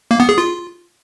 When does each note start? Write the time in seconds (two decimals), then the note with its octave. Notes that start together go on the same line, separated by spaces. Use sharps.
0.11 A#3
0.20 B3
0.29 G#4
0.38 F4